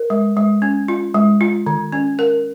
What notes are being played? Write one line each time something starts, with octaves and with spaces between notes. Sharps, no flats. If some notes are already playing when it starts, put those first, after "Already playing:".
Already playing: A#4
G#3
G#3
C#4
F4
G#3
F4
D#3
C#4
A#4